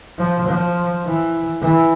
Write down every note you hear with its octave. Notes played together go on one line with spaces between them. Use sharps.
F3
F3
E3
E3